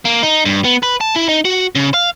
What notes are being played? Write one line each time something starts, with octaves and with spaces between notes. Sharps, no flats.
A#3
D#4
G2
B3
B4
A5
E4
D#4
F#4
C#3
F5